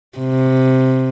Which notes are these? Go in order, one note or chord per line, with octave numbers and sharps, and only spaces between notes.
C3